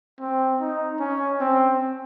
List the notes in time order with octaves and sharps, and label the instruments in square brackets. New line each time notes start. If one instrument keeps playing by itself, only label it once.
[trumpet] C4
D#4
C#4
C4